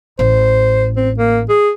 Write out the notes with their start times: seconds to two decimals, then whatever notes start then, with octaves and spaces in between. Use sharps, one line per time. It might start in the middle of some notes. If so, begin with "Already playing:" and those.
0.19 A1 C5
0.96 C4
1.18 A#3
1.49 G#4